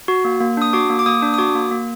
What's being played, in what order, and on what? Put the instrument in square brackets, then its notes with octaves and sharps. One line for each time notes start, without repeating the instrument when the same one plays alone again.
[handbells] F#4
A#3
A#3
D4 D#6
F#4 D6
A#3
D6
A#3 D#6
D4
D#6
F#4 D6
A#3
A#3